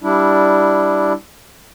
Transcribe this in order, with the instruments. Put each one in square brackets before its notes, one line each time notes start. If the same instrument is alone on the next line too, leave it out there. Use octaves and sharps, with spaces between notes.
[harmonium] G3 D4 E4